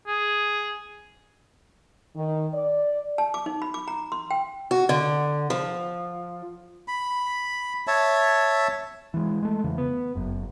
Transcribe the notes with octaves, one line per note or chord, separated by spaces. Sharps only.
G#4
D#3
D5
A5
D6
D#4
B5
D6
A#5
C6
G5
F#4
D3
F3
B5
C#5 E5 A5
E3 G#3
G#3 A3
F2 C#3 E3
B3
F#1 F#2